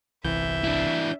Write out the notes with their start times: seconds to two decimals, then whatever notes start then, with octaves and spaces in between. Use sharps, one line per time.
0.24 G1 C2 E3 E5 G6
0.64 D4 E4